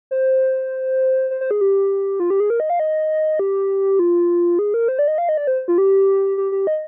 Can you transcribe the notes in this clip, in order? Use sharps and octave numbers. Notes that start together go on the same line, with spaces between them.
C5
C5
C5
G#4
G4
F4
G4
G#4
A#4
D#5
F5
D#5
G4
F4
G#4
A#4
C5
D5
D#5
F5
D#5
D5
C5
F4
G4
G4
G4
D#5